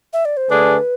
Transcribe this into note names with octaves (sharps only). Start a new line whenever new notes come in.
E5
D5
C5
D3 A3 D4 G#4 B4